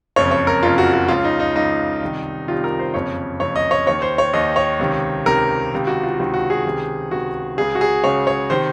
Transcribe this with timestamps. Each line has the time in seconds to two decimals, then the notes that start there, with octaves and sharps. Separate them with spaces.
0.16 F#1 F2 C#3 C#5
0.31 C#5
0.47 A#4
0.63 F#1 F2 C#3 F4
0.78 F#4
0.93 F#4
1.08 C#2 C#3 F4
1.24 D#4
1.40 D#4
1.55 C#2 C#3 D#4
2.02 C2 C3 D#3
2.47 C2 C3 D#3 F4
2.64 A#4
2.79 C5
2.94 F#1 F2 C#3 C#5
3.40 F#1 F2 C#3 C#5
3.56 D#5
3.71 C#5
3.86 D#2 D#3 C#5
4.02 C5
4.18 C#5
4.33 D#2 D#3 D#5
4.56 C#5
4.79 C#2 C3 D#3
5.25 C#2 C3 D#3 A#4
5.72 C#2 C3 D#3
5.87 F#4
6.03 F4
6.19 C#2 C3 D#3
6.34 F#4
6.50 G#4
6.65 C#2 C3 D#3
7.11 C#2 C3 D#3 F#4
7.57 C#2 C#3 G#4
7.75 F#4
7.81 G#4
8.04 C#2 C#3 C#5
8.27 C#5
8.50 C3 D#3 C5